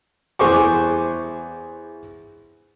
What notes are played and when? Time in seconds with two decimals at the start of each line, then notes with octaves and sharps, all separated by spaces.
0.39 E2 G#4 C5 C#6 D6